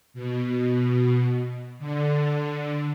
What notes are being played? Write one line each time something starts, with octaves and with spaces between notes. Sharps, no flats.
B2
D3